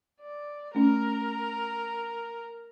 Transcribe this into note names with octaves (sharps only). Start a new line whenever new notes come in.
D5
A3 C#4 A#4